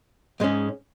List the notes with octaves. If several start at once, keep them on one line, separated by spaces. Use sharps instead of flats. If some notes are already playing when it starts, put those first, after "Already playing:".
G#2 G#3 C#4